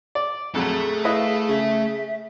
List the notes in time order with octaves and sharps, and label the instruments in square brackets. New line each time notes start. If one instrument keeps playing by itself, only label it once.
[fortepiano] D5
[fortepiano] A#1 F2 F#3 [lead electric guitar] A3 A4 [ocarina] G#4
[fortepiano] E4 B4 D#5 [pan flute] F5
[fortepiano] C#3 [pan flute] E5